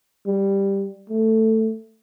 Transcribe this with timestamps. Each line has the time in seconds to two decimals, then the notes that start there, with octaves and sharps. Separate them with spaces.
0.26 G3
1.10 A3